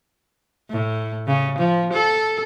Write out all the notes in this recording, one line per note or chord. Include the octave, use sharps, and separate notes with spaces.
A2
C#3
F3
A4